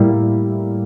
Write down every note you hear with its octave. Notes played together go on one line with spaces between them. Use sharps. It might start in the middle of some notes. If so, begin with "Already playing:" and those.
Already playing: A2 G3 A#3 E4